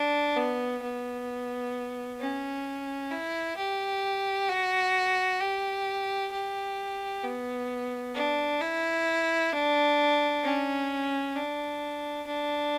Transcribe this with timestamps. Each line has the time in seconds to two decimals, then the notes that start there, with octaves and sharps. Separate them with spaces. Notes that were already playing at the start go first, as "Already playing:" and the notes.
Already playing: D4
0.36 B3
0.82 B3
2.20 C#4
3.11 E4
3.57 G4
4.48 F#4
5.40 G4
6.32 G4
7.23 B3
8.14 D4
8.61 E4
9.53 D4
10.44 C#4
11.35 D4
12.27 D4